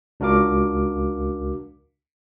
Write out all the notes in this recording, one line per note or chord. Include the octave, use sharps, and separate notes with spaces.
C#2 D4 F#4 A#4 F5 D6